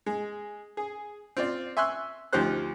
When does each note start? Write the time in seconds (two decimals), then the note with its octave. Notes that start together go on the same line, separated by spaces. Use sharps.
0.06 G#3
0.77 G#4
1.37 C4 F4 D5
1.77 E5 G#5 C6 C#6 E6 F#6
2.33 D2 F3 D#4 G4 C5 F#6